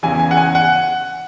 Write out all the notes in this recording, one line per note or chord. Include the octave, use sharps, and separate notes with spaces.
E2 C#3 E3 G#5
G#5
F#5
G#5
F#5